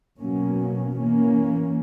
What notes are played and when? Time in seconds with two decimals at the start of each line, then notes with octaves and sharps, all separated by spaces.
0.21 B2 F#3 A#3 C#4
0.98 E3 A#3 C#4